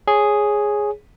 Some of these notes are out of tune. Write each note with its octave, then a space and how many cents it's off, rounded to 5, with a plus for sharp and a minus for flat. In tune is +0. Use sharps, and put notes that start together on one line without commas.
G#4 +0 C#5 +0